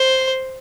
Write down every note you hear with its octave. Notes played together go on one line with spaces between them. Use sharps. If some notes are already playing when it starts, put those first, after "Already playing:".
Already playing: C5